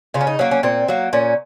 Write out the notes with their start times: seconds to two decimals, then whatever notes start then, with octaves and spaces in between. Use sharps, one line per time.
0.14 C#3 F4
0.21 C#4
0.27 D#4
0.39 F#3 A#3 C#4
0.51 C#4
0.63 A#2 C4
0.88 F#3 A#3
1.13 A#2 C#4